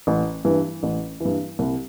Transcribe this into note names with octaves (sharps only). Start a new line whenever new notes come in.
A1
G2 E3
A1
G2 E3
C2